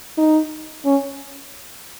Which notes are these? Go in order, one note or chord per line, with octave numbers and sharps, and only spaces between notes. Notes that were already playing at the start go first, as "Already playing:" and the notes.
D#4
C#4